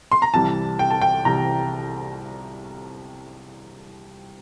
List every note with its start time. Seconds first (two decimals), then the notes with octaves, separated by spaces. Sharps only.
0.12 C6
0.22 A#5
0.34 C2 C3 E3 G3 A5
0.79 G5
0.90 A5
1.01 G5
1.25 C2 C3 E3 G3 A#5